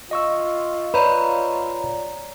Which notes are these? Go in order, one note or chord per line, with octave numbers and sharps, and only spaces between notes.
F4 D#5 C#6 E6
F4 B4 C#5 D5 A#5